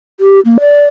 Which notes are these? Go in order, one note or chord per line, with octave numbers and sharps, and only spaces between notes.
G4
A#3
D5